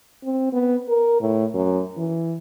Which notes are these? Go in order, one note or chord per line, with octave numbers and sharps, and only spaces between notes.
C4
B3
A#4
A2
F#2
E3